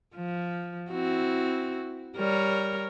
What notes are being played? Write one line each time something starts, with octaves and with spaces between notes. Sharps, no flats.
F3
C4 E4 F#4
G3 A#4 C#5